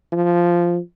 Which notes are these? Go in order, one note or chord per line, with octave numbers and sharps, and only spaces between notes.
F3